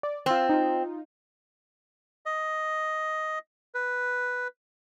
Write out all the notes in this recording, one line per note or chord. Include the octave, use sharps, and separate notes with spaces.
D5
C4 F4 E6
D#4 F4
D#5
B4